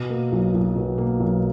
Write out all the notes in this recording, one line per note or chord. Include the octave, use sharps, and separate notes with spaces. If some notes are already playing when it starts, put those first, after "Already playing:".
Already playing: B2
A#3
B1
B1
B2
A#3
B1